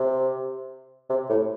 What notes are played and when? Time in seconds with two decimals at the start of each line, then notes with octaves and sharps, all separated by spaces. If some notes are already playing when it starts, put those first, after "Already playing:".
Already playing: C3
1.10 C3
1.29 A2